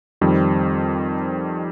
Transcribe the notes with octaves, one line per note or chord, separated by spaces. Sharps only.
F2 D#3 G3 C4